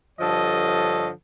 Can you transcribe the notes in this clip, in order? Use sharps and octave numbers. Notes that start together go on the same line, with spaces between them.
G2 D3 F3 A4 C#5 D#5